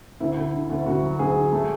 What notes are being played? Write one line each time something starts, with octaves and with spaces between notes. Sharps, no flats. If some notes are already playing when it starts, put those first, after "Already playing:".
D2 E4
D2
D3
D2
D2 F#4
F#3
D2 G#4
D3
A3